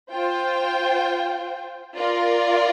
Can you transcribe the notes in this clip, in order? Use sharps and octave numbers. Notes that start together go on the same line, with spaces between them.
F4 C5 G5
F4 A#4 D5